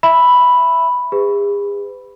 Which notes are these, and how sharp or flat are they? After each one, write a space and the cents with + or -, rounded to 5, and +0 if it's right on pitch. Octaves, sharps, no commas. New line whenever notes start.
E5 +0 B5 +0 E6 +0
G#4 -40 B4 +35